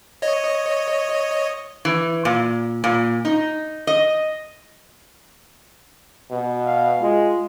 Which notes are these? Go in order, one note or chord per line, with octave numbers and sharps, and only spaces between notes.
C#5 D#5
E3
A#2
A#2
D#4
D#5
B2
F5
G#3 F4